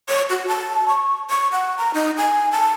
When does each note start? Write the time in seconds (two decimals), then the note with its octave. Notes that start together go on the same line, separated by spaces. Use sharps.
0.09 C#5
0.30 F#4
0.48 A5
0.88 C#6
1.30 C#6
1.52 F#5
1.78 A#5
1.94 D#4
2.17 G#5
2.52 A5